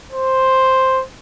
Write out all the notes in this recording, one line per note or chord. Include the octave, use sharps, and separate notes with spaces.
C5